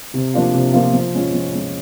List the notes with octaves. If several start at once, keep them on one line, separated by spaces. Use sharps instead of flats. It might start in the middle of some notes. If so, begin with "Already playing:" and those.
C3
F3 A#3 D4 F4
C3
F3 A#3 D4 F4
F3
G#3 C#4 F4
F3
G#3 C#4 F4